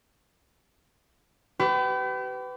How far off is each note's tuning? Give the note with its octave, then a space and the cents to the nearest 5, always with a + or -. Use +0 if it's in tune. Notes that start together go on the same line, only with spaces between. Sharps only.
G4 -35 B4 +25